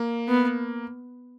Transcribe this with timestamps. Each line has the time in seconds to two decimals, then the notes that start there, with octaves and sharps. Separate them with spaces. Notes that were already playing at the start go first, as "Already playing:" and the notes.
Already playing: A#3
0.28 B3